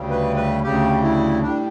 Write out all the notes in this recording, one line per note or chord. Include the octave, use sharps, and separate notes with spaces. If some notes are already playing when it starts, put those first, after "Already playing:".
Already playing: D2 C#3 G3
B4
B4
D2 C#3 G3 G4
E4
A2 G3 D4